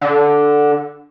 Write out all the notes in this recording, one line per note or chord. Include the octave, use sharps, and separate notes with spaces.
D3